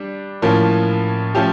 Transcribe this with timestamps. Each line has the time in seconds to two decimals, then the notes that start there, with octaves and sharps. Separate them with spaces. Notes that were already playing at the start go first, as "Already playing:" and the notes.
Already playing: G3 D4
0.42 A2 F3 A#3 C#4
1.35 F3 A3 C#4 G4